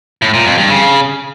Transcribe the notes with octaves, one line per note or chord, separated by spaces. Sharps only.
A2
A#2
F2
G2
C#3